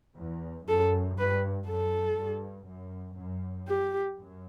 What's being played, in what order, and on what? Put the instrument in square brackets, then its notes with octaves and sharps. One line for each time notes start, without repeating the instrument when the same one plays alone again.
[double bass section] E2
[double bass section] F#2 [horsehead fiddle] A4
[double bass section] G2 [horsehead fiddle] B4
[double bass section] F#2 [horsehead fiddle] A4
[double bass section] G2
F#2
F#2
[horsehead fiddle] G4
[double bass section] F#2